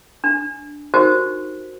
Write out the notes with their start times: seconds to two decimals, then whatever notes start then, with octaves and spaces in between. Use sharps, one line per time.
0.24 D4
0.94 D#4 F#4 G4 A#4 C5